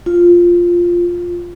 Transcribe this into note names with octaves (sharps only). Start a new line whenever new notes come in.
F4